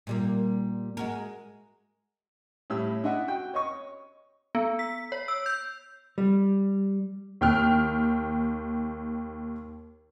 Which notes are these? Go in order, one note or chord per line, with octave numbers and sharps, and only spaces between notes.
A#2 G3 A#3
G#3 F#4 A#4
A2 G3 E4 C#5 E6
D4 E4 D#5 E5 F#5
F#4 G5
C#5 D#5 C#6
B3
B6
C#5
E6
G6
G3
D#2 G5 F6